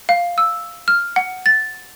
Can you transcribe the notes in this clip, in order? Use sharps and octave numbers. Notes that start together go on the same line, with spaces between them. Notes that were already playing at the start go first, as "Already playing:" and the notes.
F5
E6
F6
F#5
A6